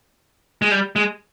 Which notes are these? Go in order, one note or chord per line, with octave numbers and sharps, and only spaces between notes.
G#3
G3
G#3